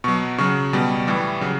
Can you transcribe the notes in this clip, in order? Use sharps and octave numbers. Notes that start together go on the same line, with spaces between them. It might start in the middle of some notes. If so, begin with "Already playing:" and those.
B2 F#3 C#6
C#3 F#3 C#6
B2 G3
A2 E3 G3
C#3 F#3